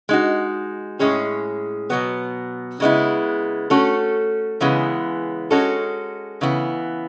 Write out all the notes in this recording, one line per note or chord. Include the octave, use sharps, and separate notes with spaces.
G#3 D#4 F#4
A2 G#3 C#4 G#4
B2 F#3 B3
C#3 G#3 B3 E4
A3 C#4 F#4 A4
C#3 E3 G#3 B3
G#3 C#4 F#4 A4
C#3 E3 B3